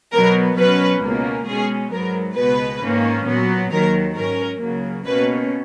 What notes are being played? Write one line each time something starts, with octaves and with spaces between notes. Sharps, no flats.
B2 F#3 B3 A#4
B2 F#3 C#4 B4
C#2 B2 A#3 C#4
B2 G#3 C#4 G#4
G#2 F#3 B3 A#4
C#2 B2 G#3 B3 B4
G#2 D#3 A#3 C#4
A#2 F#3 B3
D#2 D#3 F#3 A#4
G#2 F#3 C#4 A#4
C#2 C#3 F#3 A#3
B2 A#3 C#4 B4